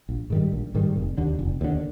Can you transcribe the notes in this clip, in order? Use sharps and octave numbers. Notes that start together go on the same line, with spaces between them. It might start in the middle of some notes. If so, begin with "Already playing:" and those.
A#1
G#2 D#3 G3
A#1
G#2 D#3 G3
F1
D#2 D3
F1
D#2 D3